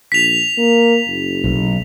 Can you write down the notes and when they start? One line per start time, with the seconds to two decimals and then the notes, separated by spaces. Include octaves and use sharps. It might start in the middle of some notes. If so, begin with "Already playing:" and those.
0.12 A#1 B6 F7
0.58 A#3
1.06 F#1
1.44 B1